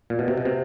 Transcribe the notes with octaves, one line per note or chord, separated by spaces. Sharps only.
A#2
B2
C3
B2
C3